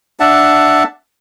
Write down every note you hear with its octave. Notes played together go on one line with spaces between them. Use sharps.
D4 E5 F#5 A5